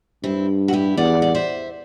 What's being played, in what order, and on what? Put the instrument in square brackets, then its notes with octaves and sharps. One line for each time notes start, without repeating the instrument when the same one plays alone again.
[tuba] G2 [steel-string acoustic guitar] C4 E4
[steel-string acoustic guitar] F#4
E4 G4
[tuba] E2 [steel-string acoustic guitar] D5 F#5
[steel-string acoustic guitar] D5
C5 E5